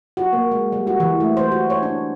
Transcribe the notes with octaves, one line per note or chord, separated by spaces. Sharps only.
F#4
A#3
G#3
G3
F#4
E3
A3
C5
F#4
C#5
D4